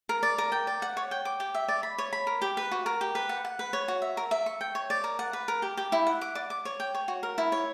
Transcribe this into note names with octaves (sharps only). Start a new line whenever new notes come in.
A#4
D5
A#4
G5
D5
F#5
C#5
G5
D6
G4
E5
D5
B5
C#5
B5
A#4
G4
B4
F#4
A#4
G4
B4
F#5
F#5
B4
C#5
F#4
E5
A#4
E5
C#6
G5
C#5
D5
A#4
F#5
B4
A#4
G4
G4
E4
F#5
D6
D5
D6
C#5
G5
C#5
F#4
A#4
E4
C#5